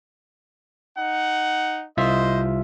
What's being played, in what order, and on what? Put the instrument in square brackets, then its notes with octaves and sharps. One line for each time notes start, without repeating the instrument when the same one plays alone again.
[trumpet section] D#4 F#5
[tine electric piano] C2 F4 E5 [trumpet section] C5 D#5